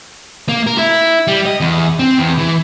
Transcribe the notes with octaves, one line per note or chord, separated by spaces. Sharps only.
A#3
A#4
E4
G3
D#5
E2
C4
E2
E3